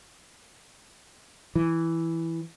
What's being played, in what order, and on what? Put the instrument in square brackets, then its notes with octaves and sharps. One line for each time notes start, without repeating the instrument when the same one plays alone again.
[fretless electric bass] E3